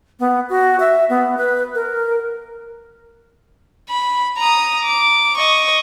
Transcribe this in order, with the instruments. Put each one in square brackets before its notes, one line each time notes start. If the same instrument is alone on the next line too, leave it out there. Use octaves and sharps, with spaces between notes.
[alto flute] B3
F#4
E5
B3
B4
A#4
[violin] B5
A#5 D#6
D6
D#5 C#6